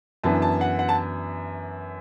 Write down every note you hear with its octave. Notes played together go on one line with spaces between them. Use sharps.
F#2 E3 B3 D4 A5
A5
F#5
F#5
A5